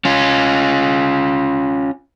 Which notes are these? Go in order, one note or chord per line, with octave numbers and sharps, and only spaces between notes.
C#4 F4